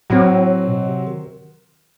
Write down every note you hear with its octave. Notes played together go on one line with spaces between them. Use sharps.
A2 F#3 C4 F#4
B2
C3
D#3